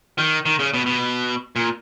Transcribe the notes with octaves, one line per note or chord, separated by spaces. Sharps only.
D#3
D#3
C#3
B2
B2
A#2